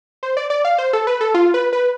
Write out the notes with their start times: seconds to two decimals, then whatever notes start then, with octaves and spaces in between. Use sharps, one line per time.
0.23 C5
0.37 D5
0.50 D5
0.65 F5
0.78 C5
0.93 A4
1.07 B4
1.21 A4
1.34 F4
1.54 B4
1.73 B4